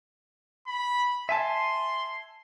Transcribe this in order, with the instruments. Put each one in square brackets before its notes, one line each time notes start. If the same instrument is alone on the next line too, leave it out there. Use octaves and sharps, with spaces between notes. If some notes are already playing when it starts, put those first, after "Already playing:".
[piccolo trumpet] B5
[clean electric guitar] E5 G#5 A5 [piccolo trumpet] C6